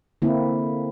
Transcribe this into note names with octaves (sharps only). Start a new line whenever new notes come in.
D3 A#3 C4 E4